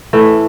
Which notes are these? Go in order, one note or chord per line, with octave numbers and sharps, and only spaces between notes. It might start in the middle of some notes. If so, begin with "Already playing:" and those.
A2 E3 A3